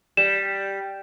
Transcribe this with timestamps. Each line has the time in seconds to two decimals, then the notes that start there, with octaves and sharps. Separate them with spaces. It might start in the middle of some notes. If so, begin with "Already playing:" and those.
0.17 G3 E7